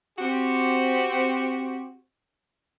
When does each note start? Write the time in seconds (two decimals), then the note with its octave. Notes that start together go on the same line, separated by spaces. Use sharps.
0.19 C4 F#4 G4